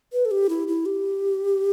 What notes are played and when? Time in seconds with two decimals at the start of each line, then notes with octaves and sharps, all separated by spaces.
0.13 B4
0.25 A4
0.31 G4
0.49 E4
0.68 E4
0.86 G4